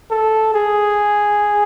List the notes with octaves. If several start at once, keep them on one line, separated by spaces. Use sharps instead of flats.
A4
G#4